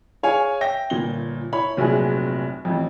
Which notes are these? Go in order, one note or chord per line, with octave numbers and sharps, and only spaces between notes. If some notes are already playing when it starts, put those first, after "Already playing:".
G#4 C#5 F5 G#5
E5 G5 A#6
G1 A#2 G7
E4 C#5 B5
F1 A#1 F#3 G#4
A1 F2